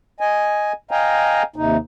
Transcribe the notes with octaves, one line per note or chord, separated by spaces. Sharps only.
D#5 G#5
D#5 F5 G5 G#5 A#5
D#2 C3 D#4